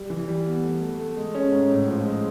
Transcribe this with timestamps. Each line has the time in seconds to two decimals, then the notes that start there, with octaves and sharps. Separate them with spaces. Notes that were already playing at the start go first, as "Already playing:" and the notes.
Already playing: G3
0.10 E3
0.28 G3
0.46 B3
0.63 A3
0.81 A3
0.99 A3
1.16 G#3
1.35 C#4
1.52 G#2
1.70 A2
1.88 F3
2.05 G#3